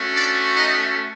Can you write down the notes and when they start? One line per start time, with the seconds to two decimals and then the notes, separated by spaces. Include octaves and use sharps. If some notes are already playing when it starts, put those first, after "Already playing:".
Already playing: A3 C#4 F#4
0.12 D4 D5
0.54 D#4 D#5